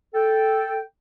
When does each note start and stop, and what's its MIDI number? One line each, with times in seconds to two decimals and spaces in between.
0.14 0.81 69
0.14 0.81 79